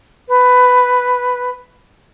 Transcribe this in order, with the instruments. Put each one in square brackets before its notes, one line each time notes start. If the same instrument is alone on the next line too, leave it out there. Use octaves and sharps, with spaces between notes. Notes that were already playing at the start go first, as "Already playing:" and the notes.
[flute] B4